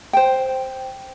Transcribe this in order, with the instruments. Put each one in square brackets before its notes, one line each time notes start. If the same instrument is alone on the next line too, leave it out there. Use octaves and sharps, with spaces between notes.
[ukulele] C5 G5